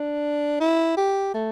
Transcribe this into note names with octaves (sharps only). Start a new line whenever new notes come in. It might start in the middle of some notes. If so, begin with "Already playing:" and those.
Already playing: D4
E4
G4
A3